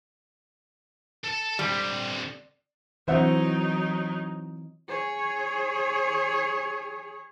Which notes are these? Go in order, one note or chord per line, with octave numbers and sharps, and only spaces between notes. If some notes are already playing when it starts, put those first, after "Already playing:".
A4 A5
D3 G3 C4
E3 F#3 C4 D#4 C5 E5 F#5
G#4 C#5